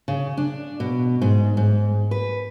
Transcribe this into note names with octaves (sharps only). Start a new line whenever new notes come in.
C#3
D4
B2
G#2
G#2
B4